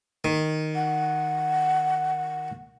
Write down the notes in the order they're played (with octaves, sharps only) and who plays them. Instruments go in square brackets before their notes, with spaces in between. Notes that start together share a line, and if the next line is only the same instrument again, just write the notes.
[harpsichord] D#3
[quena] F#5